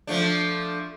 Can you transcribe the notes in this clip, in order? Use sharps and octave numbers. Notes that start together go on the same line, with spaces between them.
F3 A3 D4